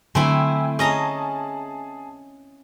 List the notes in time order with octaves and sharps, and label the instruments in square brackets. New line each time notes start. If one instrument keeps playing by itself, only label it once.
[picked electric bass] D3 F#3 [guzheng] A3 C4 E4 [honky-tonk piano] G5 G#5
[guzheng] C#4 D#5 A#5 [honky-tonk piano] G#4 A5